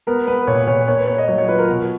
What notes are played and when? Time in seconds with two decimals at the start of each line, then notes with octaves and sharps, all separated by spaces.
0.07 B3 A#4
0.27 B3 B4
0.47 A#2 C#5
0.67 A#2 C#5
0.88 A#3 C#5
0.98 B4
1.08 A#3 C#5
1.18 D#5
1.28 F#3 C#5
1.38 C#5
1.48 F4 B4
1.58 A#4
1.69 B2